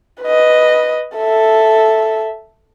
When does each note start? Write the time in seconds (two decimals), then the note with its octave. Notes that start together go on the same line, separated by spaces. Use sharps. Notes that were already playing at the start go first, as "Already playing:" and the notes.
0.22 B4 D#5
1.17 A4 E5